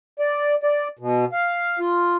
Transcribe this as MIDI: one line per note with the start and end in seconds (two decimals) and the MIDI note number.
0.20 0.55 74
0.63 0.88 74
0.99 1.25 47
1.33 1.79 77
1.79 2.17 65